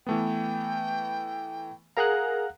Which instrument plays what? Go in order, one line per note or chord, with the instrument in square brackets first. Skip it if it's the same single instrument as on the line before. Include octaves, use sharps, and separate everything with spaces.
[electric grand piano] E3 A3 B3 [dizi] G5
[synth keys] G#4 A#4 A#5 [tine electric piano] F5 F#5 F#6